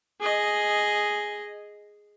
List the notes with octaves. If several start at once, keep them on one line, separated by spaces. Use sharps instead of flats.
G#4 D#5